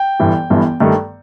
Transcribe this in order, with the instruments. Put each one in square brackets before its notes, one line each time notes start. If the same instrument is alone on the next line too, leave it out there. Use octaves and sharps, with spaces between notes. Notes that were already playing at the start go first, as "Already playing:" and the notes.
Already playing: [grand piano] G5
G1 G2 E3
G1 G2 E3
G2 D#3 A3